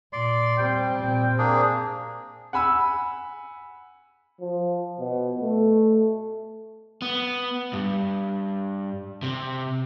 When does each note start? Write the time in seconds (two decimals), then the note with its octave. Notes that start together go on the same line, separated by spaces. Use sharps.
0.13 A#2 D5 C6
0.58 G3 C4 G5
0.97 A#2 C4
1.39 A#3 D4 G#4
2.53 F#5 G#5 B5 E6
4.41 F3
5.00 B2
5.41 A3
7.02 B3
7.73 G2
9.23 C3